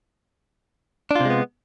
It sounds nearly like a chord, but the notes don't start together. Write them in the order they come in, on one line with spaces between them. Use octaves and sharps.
D4 F4 C3 G#3 B3